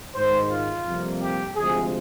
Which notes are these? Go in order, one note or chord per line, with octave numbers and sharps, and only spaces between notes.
G#2 D#3 G#3 C5
F4
F2 C3 G3 A#3
G4
D2 C3 F3 G#3 G#4